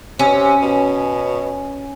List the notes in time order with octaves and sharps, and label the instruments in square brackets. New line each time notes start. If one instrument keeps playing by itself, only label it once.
[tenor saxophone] C3 [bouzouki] C#4
[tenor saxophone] B2
C3
B2